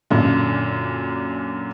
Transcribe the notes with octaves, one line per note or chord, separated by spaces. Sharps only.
F#2 A#2 D3